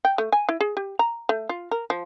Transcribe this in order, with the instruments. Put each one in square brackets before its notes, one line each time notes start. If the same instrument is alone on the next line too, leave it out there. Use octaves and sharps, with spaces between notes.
[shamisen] G5
A3
G#5
E4
G#4
G4
A#5
A3
F4
A#4
F3